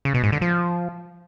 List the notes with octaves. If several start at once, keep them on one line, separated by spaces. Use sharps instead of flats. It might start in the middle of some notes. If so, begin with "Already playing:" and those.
C#3
B2
G#2
D3
F3